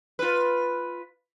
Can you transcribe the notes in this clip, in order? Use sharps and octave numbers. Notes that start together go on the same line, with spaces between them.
F4 B4